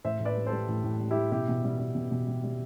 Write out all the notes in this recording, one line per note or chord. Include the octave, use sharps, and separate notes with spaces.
A2 C5 E5
A2
B4 D5
G3
A4 C5
G3
A2
A2
G3
G3 E4 G4
B2 E4 G4
B2
G3
G3
B2
B2
G3
G3